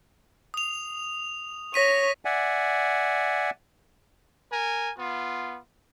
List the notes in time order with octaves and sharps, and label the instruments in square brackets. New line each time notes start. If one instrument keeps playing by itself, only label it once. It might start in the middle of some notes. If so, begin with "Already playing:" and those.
[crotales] D#6 F7
[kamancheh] C#5 [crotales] A#6 B6 D#7
[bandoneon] D5 E5 F#5 G#5
[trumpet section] A#4 G#5
B3 F4